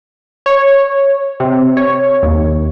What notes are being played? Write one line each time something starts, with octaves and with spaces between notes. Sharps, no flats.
C#5
C3
C#5
D#2